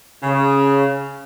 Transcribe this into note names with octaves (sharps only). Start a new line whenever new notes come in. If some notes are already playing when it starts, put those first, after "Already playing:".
C#3